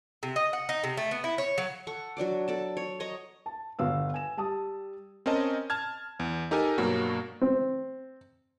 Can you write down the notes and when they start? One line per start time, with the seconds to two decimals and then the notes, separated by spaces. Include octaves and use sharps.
0.23 C3
0.36 D#5
0.53 F#5
0.69 D#4
0.84 C3
0.97 A3
1.11 B3
1.24 E4
1.38 C#5
1.58 F#3
1.87 A4 F#5 C#6
2.17 F#3 D4 D5 D6
2.48 A4 D5 A5
2.77 C#5
3.00 C#5 D#5 A#5 C#6
3.46 A5
3.79 G1 B3 F5 E6
4.14 G#5 E7
4.37 G3 A5 D#6
5.26 C4 C#4 A#4 D#5 A5
5.70 A5 F6 G#6
6.20 E2
6.51 D#4 G4 A4 A#4 G#5
6.78 G2 B2 F#3 A#3 F#4
7.41 C4